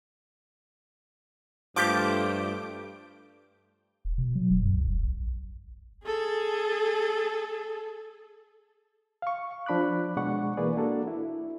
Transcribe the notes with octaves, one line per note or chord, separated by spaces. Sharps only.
G2 F3 A3 F4 G4 D6 G6 D7
D#1
B2
F#3
D#1
F#2
C#2
F1
A#1
G#4 A4
F5 C#6
F3 D4 B5 D6 F#6
B2 G#3 D4 F#5 C#6
E3 A#3 G#4 B4 D5
A#3 D4 F#4 A4
E4